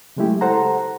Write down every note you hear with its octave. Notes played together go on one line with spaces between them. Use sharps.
C#3 F#3 G#3 A3 E4 G4
A4 C5 F#5 A#5